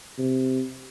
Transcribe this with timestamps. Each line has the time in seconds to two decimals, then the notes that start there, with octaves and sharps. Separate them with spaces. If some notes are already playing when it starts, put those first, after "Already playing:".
0.18 C3